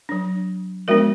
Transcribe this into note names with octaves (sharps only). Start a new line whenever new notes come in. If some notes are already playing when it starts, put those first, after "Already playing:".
F#3 D4
F3 G#3 B3 D4 F#4 A#4